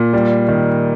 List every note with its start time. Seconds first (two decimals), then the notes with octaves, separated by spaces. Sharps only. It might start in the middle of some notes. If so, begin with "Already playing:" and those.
Already playing: A#2
0.13 G3
0.48 D#3